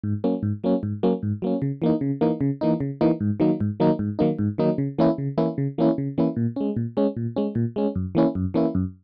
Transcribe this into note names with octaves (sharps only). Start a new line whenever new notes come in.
G#2
F#3 A#3 C#4
G#2
F#3 A#3 C#4
G#2
F#3 A#3 C#4
G#2
F#3 A#3 C#4
C#3
E3 A#3 D#4
C#3
E3 A#3 D#4
C#3
E3 A#3 D#4
C#3
E3 A#3 D#4
G#2
D#3 F#3 A#3 D#4
G#2
D#3 F#3 A#3 D#4
G#2
D#3 F#3 A#3 D#4
G#2
D#3 F#3 A#3 D#4
C#3
E3 A#3 C#4 E4
C#3
E3 A#3 C#4 E4
C#3
E3 A#3 C#4 E4
C#3
E3 A#3 C#4 E4
A#2
G#3 C#4
A#2
G#3 C#4
A#2
G#3 C#4
A#2
G#3 C#4
F#2
E3 A#3 C#4 E4
F#2
E3 A#3 C#4 E4
F#2